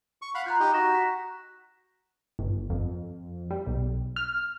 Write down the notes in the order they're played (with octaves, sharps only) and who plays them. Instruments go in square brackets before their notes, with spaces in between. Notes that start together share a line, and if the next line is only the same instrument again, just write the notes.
[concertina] C#6
F5 F#5 B5
[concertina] F4 [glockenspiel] A#5 F#6 G6
[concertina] D#4 G4 D#5
[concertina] F#4 [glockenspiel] C#6 A#6 E7
[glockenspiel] B6
[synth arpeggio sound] G1
F2
G3
B1
F6